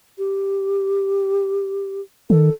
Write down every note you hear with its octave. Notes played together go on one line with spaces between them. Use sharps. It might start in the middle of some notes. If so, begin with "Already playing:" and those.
G4
D#3 A4